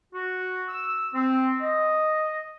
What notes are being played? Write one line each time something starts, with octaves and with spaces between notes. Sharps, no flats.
F#4
E6
C4
D#5